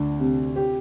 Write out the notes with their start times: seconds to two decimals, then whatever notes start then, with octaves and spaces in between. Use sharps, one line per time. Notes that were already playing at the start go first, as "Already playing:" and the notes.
Already playing: D2 D4
0.20 C3
0.56 G4